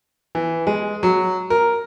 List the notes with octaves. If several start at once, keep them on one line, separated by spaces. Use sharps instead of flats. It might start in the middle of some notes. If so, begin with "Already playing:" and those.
E3
G#3
F#3
A#4